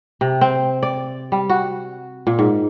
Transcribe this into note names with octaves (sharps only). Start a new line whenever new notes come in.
C3
C4
D5
G3
F#4
A#2
G#2